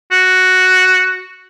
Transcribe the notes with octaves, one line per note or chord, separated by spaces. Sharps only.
F#4